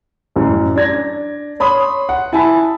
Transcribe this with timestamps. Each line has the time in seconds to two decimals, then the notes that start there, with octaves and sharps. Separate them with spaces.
0.36 A1 F#2
0.76 D4 G#6 A#6
1.60 C#5 B5 C6 D#6
2.09 F#5
2.33 E4 G#5 A5 B5